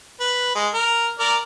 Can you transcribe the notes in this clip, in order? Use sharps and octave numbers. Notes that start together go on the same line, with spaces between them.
B4
G#3
A#4
A#4 D5